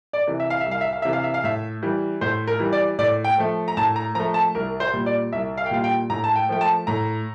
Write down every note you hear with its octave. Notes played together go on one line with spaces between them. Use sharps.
D5
C3 E3
E5
F5
E5
C2
F5
E5
F5
C3 E3 E5
F5
E5
F5
A2 E5
E3 G3
A2 C5
A#4
E3 G3
D5
A2 D5
G5
F3 A3
A#5
A2 A5
A#5
F3 A3 A#5
A5
C2 A#4
C5
A#2 G3
D5
C2 E5
F5
G5
A#2 G3 F5
G5
A2 A#5
A5
G5
F3 A3 G5
A5
A2 A#5